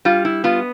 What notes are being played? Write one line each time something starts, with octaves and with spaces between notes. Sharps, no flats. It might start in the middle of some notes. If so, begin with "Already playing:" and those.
G3 F4
E4
B3 F4